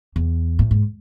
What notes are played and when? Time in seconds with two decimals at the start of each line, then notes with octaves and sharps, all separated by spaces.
0.16 E2
0.59 A2
0.71 G#2